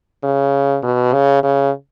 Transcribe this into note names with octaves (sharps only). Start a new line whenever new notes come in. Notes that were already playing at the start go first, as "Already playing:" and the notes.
C#3
B2
C#3
C#3